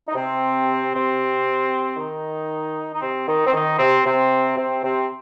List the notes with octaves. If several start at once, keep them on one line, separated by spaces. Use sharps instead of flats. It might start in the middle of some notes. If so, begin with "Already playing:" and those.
D#4
C3 C4
C3 C4
D#3 D#4
D#4
C3 C4
D#3 D#4
C4
D#3 D#4
C3 C4
C3 C4
C3 C4
C3 C4